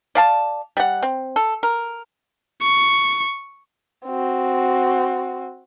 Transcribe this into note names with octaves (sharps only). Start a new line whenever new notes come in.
D5 F5 A5
G3 F#5
C4
A4
A#4
C#6
C4 F#4